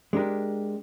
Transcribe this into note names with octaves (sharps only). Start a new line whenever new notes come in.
G#3 D4 G4 A#4